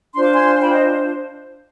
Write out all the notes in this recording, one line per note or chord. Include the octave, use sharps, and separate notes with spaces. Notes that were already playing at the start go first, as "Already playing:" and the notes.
D4 F4 C5 C6
D6
G#5 C6
G5 B5
D#5